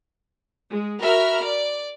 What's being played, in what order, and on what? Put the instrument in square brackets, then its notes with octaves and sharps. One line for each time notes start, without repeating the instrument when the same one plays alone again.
[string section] G#3
F#4 A#4 E5 B5 F6
D5